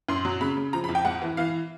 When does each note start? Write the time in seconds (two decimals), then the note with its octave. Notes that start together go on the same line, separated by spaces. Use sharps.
0.09 F#2 C6
0.25 F#3
0.41 C#3 B5
0.57 C#3
0.73 F3 A#5
0.84 B5
0.89 F2
0.95 G5
1.05 G#2 F#5
1.22 E3
1.37 E3 F5